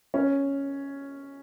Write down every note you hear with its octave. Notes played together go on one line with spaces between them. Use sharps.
C#4